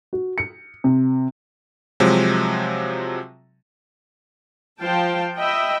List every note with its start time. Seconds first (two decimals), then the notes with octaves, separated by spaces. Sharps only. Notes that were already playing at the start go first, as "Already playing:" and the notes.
0.13 F#4
0.38 C#7
0.84 C3
2.00 C3 F3 F#3 G#3
4.82 F3 C5 F5 G5 A5
5.38 D#5 E5 G5 B5